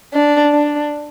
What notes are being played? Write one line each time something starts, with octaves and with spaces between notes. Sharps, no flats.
D4
D4